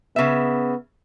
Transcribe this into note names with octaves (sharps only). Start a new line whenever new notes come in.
C#3 B3 E5